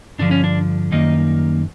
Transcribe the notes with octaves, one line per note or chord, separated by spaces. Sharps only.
G2 D3 F3 D4
C#4
D4
F#2 D#3 G3 A#3 D#4